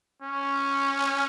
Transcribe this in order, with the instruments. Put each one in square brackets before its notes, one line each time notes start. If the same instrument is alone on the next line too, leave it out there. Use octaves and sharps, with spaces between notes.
[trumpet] C#4